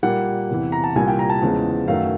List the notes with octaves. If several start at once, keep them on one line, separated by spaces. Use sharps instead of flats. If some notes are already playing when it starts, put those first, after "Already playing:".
A#2 G3 A#3 F#5
E2 C3 E3
A#5
A5
C2 A#2 G3 A#3 G#5
G5
A#5
A5
E2 C#3 F3 G#3
F#2 D#3 F#3 A3 F5